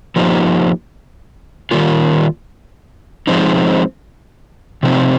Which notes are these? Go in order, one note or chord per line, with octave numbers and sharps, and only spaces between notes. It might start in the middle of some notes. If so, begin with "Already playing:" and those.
F3 A#3 D#4 G4
D#3 G3 A#3 F4
F3 G#3 C4 D#4
C3 F3 C4 D#4